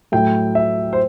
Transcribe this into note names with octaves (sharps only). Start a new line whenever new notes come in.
A2 F#3 A3 G5
E5
C5